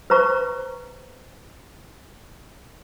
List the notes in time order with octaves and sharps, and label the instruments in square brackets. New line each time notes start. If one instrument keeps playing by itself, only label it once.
[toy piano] B4 C5 A#5 C#6